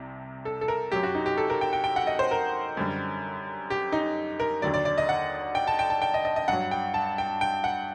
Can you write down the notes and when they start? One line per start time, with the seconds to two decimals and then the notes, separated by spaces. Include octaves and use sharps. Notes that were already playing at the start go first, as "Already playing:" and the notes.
Already playing: C2 C3
0.45 A4
0.61 A4
0.68 A#4
0.92 F#2 F#3 G4
1.03 F#4
1.15 D#4
1.26 G4
1.37 A4
1.50 A#4
1.61 G5
1.73 G5
1.84 G5
1.96 F#5
2.07 D#5
2.19 C5
2.31 A#4
2.77 F#2 D3 G3
3.70 G4
3.92 D#4
4.40 A#4
4.62 D#2 D3 F#3 D5
4.74 D5
4.85 D5
4.98 D#5
5.09 F#5
5.55 G5
5.67 A5
5.79 G5
5.90 A5
6.02 G5
6.14 D#5
6.25 D#5
6.36 D#5
6.48 G2 F#3 F#5
6.71 G5
6.94 A5
7.18 G5
7.41 G5
7.64 F#5